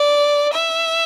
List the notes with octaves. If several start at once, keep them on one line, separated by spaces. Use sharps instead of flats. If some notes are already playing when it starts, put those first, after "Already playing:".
Already playing: D5
E5